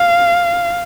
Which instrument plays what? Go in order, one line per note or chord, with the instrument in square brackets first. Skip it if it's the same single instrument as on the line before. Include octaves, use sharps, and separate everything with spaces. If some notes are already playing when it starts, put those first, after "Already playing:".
Already playing: [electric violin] F5